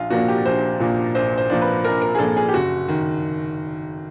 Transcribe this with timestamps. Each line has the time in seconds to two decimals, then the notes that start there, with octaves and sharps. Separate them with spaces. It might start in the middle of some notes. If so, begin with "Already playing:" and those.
Already playing: A#1 F4
0.10 A#2 F3 A#3 D4 F#4
0.28 G4
0.46 A#1 C5
0.80 A#2 F3 A#3 D4
1.15 A#1 C5
1.38 C5
1.50 A#2 F3 A#3 D4
1.62 B4
1.85 A#1 A#4
2.02 A#4
2.15 G#4
2.19 A#2 F3 A#3 D4 A4
2.37 G#4
2.49 G4
2.54 F#1 F#4
2.89 D#3